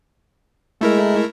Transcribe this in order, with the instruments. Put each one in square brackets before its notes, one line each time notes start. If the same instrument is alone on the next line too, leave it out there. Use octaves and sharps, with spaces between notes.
[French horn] G#3 [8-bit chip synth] A3 E4 A#4